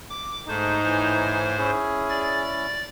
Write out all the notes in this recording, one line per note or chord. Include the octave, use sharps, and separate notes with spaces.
D6
G#2 G#3 A3 D#4 C5
A2 E3 G#5
C#4 E4 G#4
D5 A6